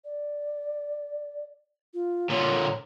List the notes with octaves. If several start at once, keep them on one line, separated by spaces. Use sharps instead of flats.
D5
F4
A#2 D3 C#5